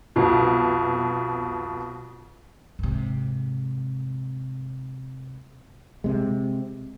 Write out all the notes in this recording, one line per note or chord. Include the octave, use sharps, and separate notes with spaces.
C2 F2 B2
G#2 C3
C3 G#3